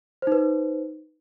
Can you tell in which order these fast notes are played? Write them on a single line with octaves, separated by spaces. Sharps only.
C5 D#4 B4